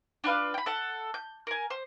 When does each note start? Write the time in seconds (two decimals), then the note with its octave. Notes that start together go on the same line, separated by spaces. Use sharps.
0.24 D4 F4 B4 F5
0.54 G5 B5
0.66 A4 F#5
1.14 G6
1.47 A#4 G#5
1.70 C5